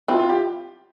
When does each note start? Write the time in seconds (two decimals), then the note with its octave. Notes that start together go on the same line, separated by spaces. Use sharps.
0.08 C4 E4 F4
0.19 F4
0.29 G4